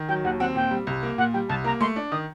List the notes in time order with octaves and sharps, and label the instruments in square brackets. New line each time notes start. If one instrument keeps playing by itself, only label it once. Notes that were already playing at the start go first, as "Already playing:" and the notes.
Already playing: [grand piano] D#3
[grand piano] F#3 [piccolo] G5
[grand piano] D#2 [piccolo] F#5
[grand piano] C4 [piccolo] F#5
[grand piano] A#2 [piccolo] G5
[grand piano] G3
C2
A#3
[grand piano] A#2 [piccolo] F#5
[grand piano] G3 [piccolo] G5
[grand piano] C2 [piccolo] A5
[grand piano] A#3 [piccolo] A#5
[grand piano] A3 [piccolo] C6
[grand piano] D4
[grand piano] D#3 [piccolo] D#6